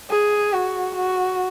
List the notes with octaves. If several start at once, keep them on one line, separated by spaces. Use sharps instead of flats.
G#4
F#4
F#4